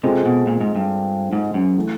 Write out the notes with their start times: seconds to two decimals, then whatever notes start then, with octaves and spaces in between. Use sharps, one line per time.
0.03 C3 G#3 C4 F4 A4
0.26 B2
0.47 A#2
0.61 G#2
0.76 G2
1.33 G#2
1.54 F#2
1.77 E3 A3